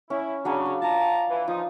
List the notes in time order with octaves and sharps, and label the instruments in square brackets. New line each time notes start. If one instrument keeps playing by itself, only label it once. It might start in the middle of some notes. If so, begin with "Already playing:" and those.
[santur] C#4 [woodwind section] E4
[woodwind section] C#3 [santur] F#3 D4 G#5
[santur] F5
[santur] F4 [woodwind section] A5 A#5
[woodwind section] E3
[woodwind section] F3 D#4 [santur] F4